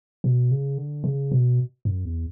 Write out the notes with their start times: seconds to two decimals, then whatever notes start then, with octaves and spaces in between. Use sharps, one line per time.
0.24 B2
0.51 C#3
0.78 D3
1.04 C#3
1.32 B2
1.85 F#2
2.05 E2